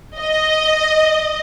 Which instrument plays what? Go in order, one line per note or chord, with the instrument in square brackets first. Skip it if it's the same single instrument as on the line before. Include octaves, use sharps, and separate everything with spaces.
[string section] D#5